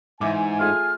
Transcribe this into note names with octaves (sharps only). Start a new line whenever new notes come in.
G#2 E3 E5 G#5 D6
A3 F4 G#4 F6